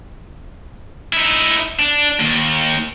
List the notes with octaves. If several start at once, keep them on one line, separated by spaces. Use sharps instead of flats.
D#4 E4
D4
D#2